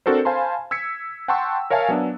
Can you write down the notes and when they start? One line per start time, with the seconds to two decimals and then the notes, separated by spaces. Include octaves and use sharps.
0.06 C4 D4 F#4 A4 A#4 C5
0.25 C5 F5 G#5 A5 B5 C6
0.71 E6 G#6 B6 C#7
1.28 F#5 G5 A5 C6 C#6 E6
1.70 A#4 C#5 E5 F5 G#5 A5
1.88 F#3 B3 D4